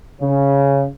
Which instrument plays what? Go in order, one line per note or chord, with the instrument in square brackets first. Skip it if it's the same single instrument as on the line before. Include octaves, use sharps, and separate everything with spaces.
[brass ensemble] C#3